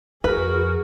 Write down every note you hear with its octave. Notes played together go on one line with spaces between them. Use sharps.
F2 F#4 G#4 A#4 B4